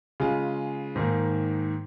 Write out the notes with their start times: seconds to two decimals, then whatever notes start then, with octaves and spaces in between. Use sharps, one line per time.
0.20 C#3 G#3 F4
0.95 G#2 D#3 A#3